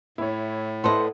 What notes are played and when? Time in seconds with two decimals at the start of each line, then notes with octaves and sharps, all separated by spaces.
0.18 A2 E4 C#5
0.84 E4 A4 B4 C5 D#5 F#5 C6